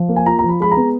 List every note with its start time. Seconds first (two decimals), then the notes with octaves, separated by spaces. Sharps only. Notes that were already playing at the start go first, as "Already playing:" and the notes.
Already playing: F3
0.09 A#3
0.16 G#5
0.26 F4 A#5
0.39 A#5
0.44 F3
0.49 B5
0.60 G#3 B5
0.71 A#5
0.77 B3